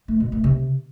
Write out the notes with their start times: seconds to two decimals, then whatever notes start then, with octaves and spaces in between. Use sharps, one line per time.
0.08 A3
0.20 B2
0.32 A3
0.44 C3